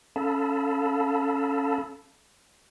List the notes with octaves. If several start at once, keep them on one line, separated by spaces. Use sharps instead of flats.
C#4 A4 F5 A5 B5 E6